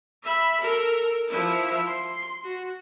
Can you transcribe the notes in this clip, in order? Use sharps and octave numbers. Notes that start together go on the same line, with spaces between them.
E5 B5
A4 A#4
F3 E4
C6
F#4